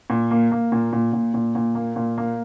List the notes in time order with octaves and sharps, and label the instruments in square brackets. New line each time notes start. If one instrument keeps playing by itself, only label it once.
[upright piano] A#2
A#3
A#3
A#2
A#2
A#2
A#2
A#2
A#3
A#2
A#3